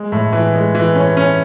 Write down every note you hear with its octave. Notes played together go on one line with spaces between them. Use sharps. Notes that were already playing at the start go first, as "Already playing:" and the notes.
Already playing: G#3
A2
E3
G#3
E3
C#4
C#4